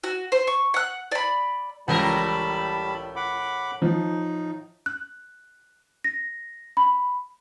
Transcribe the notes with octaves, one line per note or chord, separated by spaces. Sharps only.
F#4
C5
C#6
F#5 F#6
D5 B5
C#2 A2 E3 G3 A#4 A5 B5
F#5 B5 D6
F3 D#4
F#6
A#6
B5